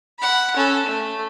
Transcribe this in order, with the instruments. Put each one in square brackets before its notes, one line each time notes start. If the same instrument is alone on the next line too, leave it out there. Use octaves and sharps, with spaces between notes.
[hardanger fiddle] F#5 B5
C#4 A4
A3